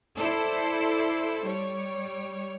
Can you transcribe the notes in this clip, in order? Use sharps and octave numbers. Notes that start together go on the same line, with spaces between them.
E4 A4 C5 D5
G3 C#5